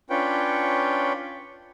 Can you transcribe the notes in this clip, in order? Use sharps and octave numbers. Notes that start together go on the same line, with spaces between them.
C#4 D4 F4 B4 C#5 G5